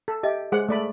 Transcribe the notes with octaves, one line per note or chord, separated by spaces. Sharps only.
A4
G4 D#5 E5
G#3 G#4 C5 F#5
A3 D5 B5